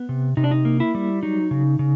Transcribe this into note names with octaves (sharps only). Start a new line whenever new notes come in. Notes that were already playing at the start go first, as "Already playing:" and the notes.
Already playing: B3
C3
C3 D#4
D4
D#4
A#3
E4
G3
F#3 D#4
C#3
C#3